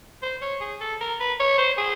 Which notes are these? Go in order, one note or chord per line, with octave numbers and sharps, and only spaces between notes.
C5
C#5
G#4
A4
A#4
B4
C#5
C5
G#4